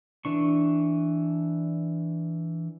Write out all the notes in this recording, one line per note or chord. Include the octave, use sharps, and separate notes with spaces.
E3 D4 C#6